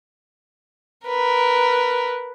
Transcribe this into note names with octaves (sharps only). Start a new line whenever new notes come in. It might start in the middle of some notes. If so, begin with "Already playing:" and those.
A#4 B4